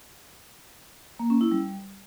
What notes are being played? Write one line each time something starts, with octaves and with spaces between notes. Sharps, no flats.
A#3
C#4
E4
G3